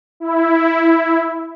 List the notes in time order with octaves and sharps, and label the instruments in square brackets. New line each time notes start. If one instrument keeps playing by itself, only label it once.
[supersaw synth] E4